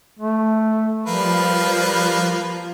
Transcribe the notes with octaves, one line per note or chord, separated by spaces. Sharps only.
A3
F3 G3 A#3 B4